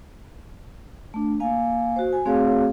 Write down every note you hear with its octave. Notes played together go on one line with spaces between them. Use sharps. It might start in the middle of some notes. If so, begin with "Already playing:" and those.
A3 D4
A#3 F5 G#5
F#4 C5
G#5
A3 C4 F#4 G#4 C#5 F5